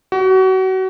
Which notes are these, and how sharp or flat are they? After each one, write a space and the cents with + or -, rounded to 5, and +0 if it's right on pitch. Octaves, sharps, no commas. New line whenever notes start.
F#4 +30